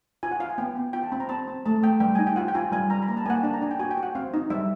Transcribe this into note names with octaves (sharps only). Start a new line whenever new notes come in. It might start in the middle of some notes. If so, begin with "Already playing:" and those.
F4 G#5
F#5
F4 F5
G#5
B3 G5
B3
F4 G5
A5
C4 B5
A#5
C4 A5
C4
A3 A5
A3 G5
G3 G5
D#4 G#5
G5
F4 F#5
G5
F4 G#5
G3 G#5
G3 A#5
B5
A#3 A#5
A5
A#3 F#5 G#5
G5
D4 A5
A#5
D4 G#5
G5
F#4 G#5
G5
F#4
F#5
C4 F5
D#4
G3 E5